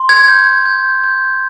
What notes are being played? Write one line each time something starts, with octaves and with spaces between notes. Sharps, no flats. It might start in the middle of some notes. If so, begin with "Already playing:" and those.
Already playing: C6
G#6
G6
G6
G6